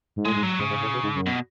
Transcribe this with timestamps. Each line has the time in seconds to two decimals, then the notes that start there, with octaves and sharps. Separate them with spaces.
0.16 G#2
0.25 A2 G#3
0.36 G#2
0.43 F#3
0.59 G#2 C#3
0.70 G#2
0.81 A2
0.93 B2
1.03 G#2
1.15 F#2
1.26 B2